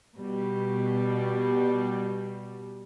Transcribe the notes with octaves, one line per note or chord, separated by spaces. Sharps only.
B2 G3